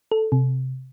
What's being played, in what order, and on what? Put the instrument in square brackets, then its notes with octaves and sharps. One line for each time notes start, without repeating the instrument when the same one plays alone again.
[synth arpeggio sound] A4
C3